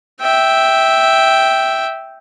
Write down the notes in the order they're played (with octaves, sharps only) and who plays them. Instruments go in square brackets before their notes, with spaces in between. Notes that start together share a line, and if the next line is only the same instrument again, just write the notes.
[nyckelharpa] E5 G5